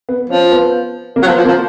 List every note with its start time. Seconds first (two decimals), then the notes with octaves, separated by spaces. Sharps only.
0.09 B3
0.30 F3 C#4
0.52 B3
1.16 A#3
1.23 F#3
1.27 F3
1.31 B3
1.38 F3
1.45 A#3
1.48 F3